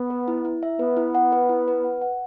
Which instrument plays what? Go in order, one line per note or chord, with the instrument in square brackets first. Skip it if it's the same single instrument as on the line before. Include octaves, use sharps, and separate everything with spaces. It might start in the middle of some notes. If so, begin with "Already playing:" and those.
Already playing: [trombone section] B3
[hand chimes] B4
E4
E4
E5
[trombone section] B3 [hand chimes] B4
[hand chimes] E4
F#5
B4
E4
B4
F#5
F#5